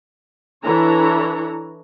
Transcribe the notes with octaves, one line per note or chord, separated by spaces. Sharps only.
E3 D4 E4 A4 C#5 A#5